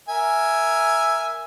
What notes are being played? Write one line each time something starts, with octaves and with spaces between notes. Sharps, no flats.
A#4 E5 G#5